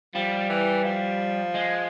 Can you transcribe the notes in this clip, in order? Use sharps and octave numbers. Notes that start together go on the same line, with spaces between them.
F3 G3
E3
F3
G#3